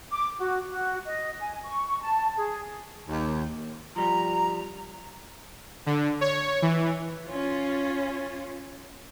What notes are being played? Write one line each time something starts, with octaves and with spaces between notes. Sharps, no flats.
D6
F#4
F#4
D#5
G#5
C#6
A5
G#4
D#2
F3 G3 A#5
D3
C#5
E3
C#4 F4